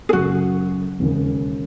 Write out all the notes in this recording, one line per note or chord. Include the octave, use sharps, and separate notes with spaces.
G#4
F#2 C#3 F#3 F#4
E1 D#2 C#3